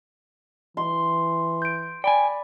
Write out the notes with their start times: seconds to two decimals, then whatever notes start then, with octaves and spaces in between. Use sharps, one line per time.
0.77 E3 C6
1.62 G6 D7
2.04 D5 G5 G#5 B5